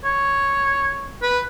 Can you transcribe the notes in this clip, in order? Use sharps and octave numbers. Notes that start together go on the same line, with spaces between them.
C#5
B4